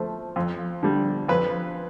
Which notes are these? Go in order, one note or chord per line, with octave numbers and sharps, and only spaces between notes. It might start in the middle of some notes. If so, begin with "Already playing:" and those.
Already playing: F3 A3
F2
D3 G3
F2 B4